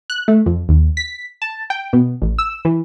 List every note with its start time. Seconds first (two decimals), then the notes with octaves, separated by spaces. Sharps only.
0.10 F#6
0.28 A3
0.46 F2
0.69 D#2
0.97 B6
1.42 A5
1.70 G5
1.93 B2
2.22 A1
2.38 E6
2.65 E3